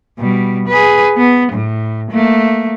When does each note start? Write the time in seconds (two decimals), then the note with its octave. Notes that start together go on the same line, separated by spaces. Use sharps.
0.19 B2 G3
0.68 G#4 B4
1.17 B3
1.52 A2
2.11 A3 A#3